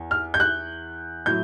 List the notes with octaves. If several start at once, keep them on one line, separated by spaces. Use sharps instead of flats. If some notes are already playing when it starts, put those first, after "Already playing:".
Already playing: E2
F6
G6
F#6
A2 F#3 A3 G6